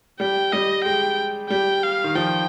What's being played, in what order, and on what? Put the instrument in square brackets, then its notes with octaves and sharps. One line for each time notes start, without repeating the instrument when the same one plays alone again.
[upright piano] G3 [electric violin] G5
[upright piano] G3 [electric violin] D#5
[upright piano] G#3 [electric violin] G5
[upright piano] G3 [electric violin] G5
[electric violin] F5
[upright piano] D#3
[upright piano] F3 [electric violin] G5